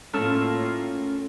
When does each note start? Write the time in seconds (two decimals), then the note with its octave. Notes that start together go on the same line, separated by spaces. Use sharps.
0.14 A2 A3 A#3 C#4 F4 A5 E6 F6